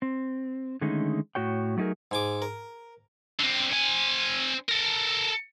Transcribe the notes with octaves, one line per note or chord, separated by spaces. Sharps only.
C4
D3 D#3 G#3 A3 C#4 D#4
A2 F#4 C#5 G5
F#3 A3 D#4 G#4 A#4
G#2 G#5 D6
A#4
D3 C4
C4 G#5
A4 A#4